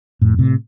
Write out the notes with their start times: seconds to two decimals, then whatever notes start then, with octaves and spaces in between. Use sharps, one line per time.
0.22 F2 A2
0.38 A2 C3